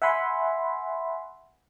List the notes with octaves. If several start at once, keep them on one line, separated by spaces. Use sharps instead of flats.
E5 F#5 G#5 B5 C6